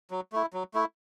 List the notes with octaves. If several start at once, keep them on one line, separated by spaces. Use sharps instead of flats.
F#3
A3 E4
F#3
A3 E4